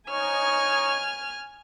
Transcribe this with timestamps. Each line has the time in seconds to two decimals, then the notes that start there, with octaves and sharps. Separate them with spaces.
0.10 D#4 C#5 G#5 F6 G#6